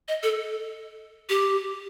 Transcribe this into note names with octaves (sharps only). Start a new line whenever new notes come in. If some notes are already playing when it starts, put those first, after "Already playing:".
D#5
A4
G4